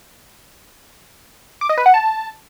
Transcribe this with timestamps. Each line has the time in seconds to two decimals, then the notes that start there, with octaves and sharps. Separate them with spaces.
1.61 D6
1.69 D#5
1.78 B4
1.86 F#5
1.94 A5